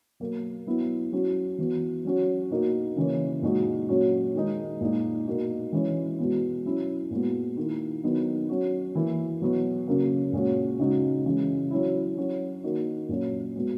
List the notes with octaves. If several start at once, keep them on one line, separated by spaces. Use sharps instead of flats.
B2 F#3 A#3
F#3 B3 E4
F#3 C#4 F#4
E3 B3 F#4
F#3 C#4 F#4
B2 A#3 D#4 F#4
C#3 E3 A#3 C#4
A#2 G#3 D#4 F#4
A#2 F#3 C#4 F#4
D#3 G#3 D#4
A#2 G#3 D#4
B2 A#3 D#4 F#4
E3 G#3 C#4 E4
B2 G#3 B3
F#3 C#4 E4
A#2 G#3 B3 F#4
D#3 A#3 E4
D#3 F#3 B3 D#4
F#3 C#4 F#4
E3 A#3 E4
B2 F#3 B3 F#4
C#3 F#3 A#3
A#2 G#3 C#4 F#4
C#3 G#3 D#4 F#4
C#3 E3 G#3
F#3 C#4 E4
F#3 C#4 F#4
D#3 A#3 D#4 F#4
A#2 F#3 C#4
B2 G#3 B3 F#4